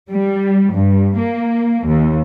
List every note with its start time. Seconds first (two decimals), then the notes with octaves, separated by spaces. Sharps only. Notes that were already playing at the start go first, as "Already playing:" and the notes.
0.11 G3
0.73 G2
1.17 A#3
1.87 D#2